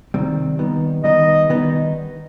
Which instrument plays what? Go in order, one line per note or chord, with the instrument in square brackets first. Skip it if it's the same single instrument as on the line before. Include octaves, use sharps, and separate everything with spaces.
[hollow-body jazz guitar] C3 D#3 G3 C4
D#3 G3 B3 D#4
[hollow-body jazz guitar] D#3 G3 B3 D#4 [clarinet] D#5
[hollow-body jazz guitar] D#3 G3 B3 D#4